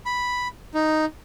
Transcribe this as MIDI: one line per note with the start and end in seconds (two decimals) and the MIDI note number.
0.06 0.48 83
0.74 1.05 63